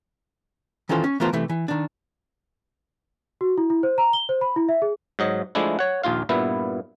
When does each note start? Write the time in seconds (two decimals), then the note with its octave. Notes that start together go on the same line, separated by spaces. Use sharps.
0.89 D#3 E3 C#4 F4 A4 C5
1.04 C#4
1.20 E3 A3 B3 F4 A#4 C5
1.33 C3 E3 A3
1.49 E3
1.68 D#3 D4
3.41 F#4
3.58 E4
3.70 E4
3.83 C5
3.98 A#5
4.13 G7
4.29 C5
4.41 B5
4.56 E4
4.69 E5
4.82 G#4
5.19 G#2 F#3 D#5
5.55 F3 G#3 A3 D4 E4
5.79 C#5 F#5
6.03 A#1 D#2 F4 F5
6.29 G2 A#2 B3 E4